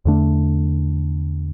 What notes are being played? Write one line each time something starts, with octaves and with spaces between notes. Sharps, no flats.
E2 D3 A3 D4